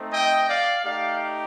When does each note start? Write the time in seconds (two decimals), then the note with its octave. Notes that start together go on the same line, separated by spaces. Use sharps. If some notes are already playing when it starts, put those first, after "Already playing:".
Already playing: A3 C4 D#4
0.12 D#5 G5
0.48 D5 F5
0.83 A3 D#4 G4 D5 F5